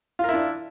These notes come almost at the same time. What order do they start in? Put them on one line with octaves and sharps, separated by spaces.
F4 A#4 E4 D4